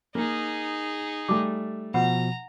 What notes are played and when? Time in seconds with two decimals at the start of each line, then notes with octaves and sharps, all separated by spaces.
0.15 A#3 D#4 G#4
1.29 G3 A3 D6
1.94 B2 F3 F#5 A#5